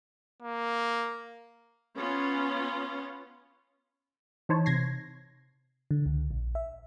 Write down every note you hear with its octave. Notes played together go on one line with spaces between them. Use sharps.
A#3
B3 C#4 F4
E3 D#4 C5 C#5 A5
C3 G#6 A#6 C7
D3
C#2
A#1
E5